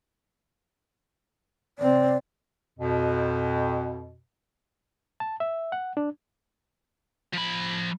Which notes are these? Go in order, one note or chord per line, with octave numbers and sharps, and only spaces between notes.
C3 C4 D5
F2 B2
A5
E5
F#5
D4
F3 B5